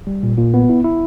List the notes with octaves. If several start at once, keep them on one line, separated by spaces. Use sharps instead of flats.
G3
A#2
A#2
B3
E4
E4